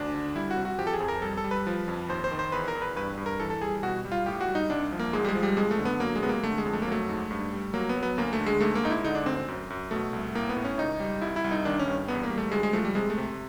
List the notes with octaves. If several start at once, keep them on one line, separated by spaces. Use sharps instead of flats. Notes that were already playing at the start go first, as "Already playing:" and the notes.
Already playing: D2 D4
D3
G3 E4
F#4
C3
F#4
F3 G4
A4
G#4
F2
A#4
G3 A4
A4
G3
B4
F3
F2
D#2 C5
C5
D#3
C5
E2 B4
A#4
E2
B4
G2 B4
G2
A#4
E3 A4
A4
G3 G#4
B2 F#4
G3
F4
A2 G4
F#4
G3
D#4
C2 D4
F3
A#3
G#2 G#3
G3
G#3
F3
G3
F2 G#3
A3
D3
B3
F#3 A#3
G#3
C3 B3
A#3
D3 A3
G#3
F2
A3
A#3
F#3
A3
G#2
G2
G3
F#3 A#3
B3
F#3
B3
D2 A#3
A3
D3
G#3
G#2 A3
A#3
G#2 D#4
E4
D3 D#4
D4
D2 C4
C4
F#2
F#2
B2 A3
C2
A2 A#3
B3
A2
C#4
C#2 D#4
G3
C2 E4
E4
C2
D#4
D#3 D4
C#4
G2
E2 B3
A#3
G3
A3
D2 G#3
G#3
F3 A3
G3
C3 G#3
A3
C3